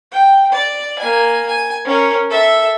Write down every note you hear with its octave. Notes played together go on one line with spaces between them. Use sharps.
G5
D5
A#3 G#5
G#5
C#4 A#4
A4 E5